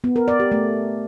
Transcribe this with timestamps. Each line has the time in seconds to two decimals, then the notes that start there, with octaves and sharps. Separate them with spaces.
0.04 B3
0.16 A#4
0.28 D5
0.40 G4
0.52 A3